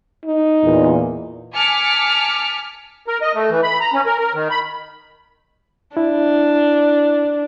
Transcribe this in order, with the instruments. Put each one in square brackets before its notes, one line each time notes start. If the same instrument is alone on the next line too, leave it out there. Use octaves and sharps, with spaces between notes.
[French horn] D#4
[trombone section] E2 A#2
[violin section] G#5 A5 D6 F6 B6 C#7
[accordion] A#4
D#5
A3
E3
B5
A#5
C#4
A#4
A#4
D#3
B5
[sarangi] D4 [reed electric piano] E4